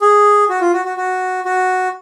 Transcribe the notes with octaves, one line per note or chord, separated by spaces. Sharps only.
G#4
F#4
F4
F#4
F#4
F#4
F#4